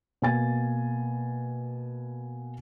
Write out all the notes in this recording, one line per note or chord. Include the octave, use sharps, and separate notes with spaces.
B2 A#3 G#5 A6